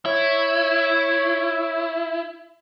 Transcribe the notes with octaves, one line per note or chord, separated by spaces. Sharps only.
E4 C#5